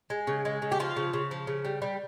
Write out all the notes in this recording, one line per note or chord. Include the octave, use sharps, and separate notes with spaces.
G#3
C#3
G#3
C#3
G4
F3 F4
C#3
C#3
F3
C#3
G3
G3